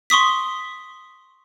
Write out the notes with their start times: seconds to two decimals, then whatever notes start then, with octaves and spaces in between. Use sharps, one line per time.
0.10 C6 C#6 D#6 B6